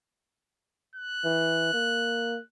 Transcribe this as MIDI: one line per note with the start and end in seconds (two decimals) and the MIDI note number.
0.95 2.44 90
1.24 1.70 52
1.73 2.39 58